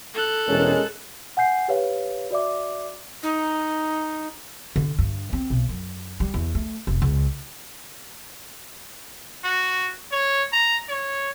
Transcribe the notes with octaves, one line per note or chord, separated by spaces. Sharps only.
A4 F#6
E1 G#3 C#4 A#4
F#5 G#5 G6 C7
G4 B4 C#5 F5
F#4 D5 E5 D6
D#4
D3
G2
C4
B1
F#2
G3
E2
A3
F1
C#2
F#4
C#5
A#5
C#5